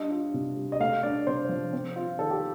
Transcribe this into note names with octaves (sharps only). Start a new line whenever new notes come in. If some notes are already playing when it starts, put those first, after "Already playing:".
Already playing: G3 D4 D#5
F4
C3
G3
D#5
A3 F5
D4 D5
C3 C5
F3
C4
F4
D#3 A4
G4